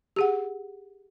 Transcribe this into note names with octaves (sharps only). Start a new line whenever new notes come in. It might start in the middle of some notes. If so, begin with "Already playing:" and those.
G4 G#4 F#5